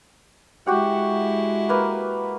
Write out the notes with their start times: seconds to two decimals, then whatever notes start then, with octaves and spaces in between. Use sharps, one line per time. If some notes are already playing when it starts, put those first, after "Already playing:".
0.66 G#3 E4 F#4 G4 F#5
1.69 A#3 B4